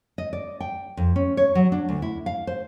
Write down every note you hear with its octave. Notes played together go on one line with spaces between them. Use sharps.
D#5
D5
G5
F2
C#4
C#5
F#3
D4
D2
E4
F5
C5